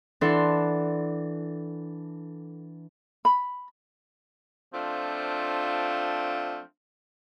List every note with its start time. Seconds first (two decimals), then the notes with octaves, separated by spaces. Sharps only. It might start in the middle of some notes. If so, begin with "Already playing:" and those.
0.21 E3 D4 A4 F#5 C6
3.25 B5
4.73 F3 A3 C4 D4 F4